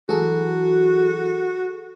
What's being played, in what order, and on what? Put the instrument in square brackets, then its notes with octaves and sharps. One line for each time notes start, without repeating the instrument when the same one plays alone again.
[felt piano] E3 F#3 [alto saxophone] F#4 [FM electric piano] G#4 A4